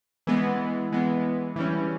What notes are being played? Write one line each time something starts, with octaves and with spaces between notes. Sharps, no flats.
E3 G#3 B3
E3 G#3 B3
E3 G3 C#4